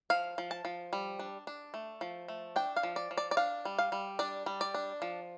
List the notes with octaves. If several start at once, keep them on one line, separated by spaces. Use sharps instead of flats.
F3 F5
F3
A5
F3
G3
D4
D4
A3
F3
A3
D4 G5
F5
F3
D5
F3
D5
D5
D4 F5
G3
F5
G3
D4 D5
G3
D5
D4
F3